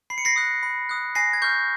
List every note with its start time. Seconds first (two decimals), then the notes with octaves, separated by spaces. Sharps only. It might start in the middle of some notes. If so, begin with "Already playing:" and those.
0.10 B5 C7
0.18 C#7
0.25 A#6 C7
0.36 D#6 F#6
0.63 B5
0.89 D#6 F#6
1.15 G#5 A#6 C7
1.33 G#6
1.42 C#6 F6 G6